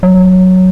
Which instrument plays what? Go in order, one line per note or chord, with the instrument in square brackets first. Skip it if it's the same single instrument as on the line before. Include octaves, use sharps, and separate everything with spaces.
[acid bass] F#3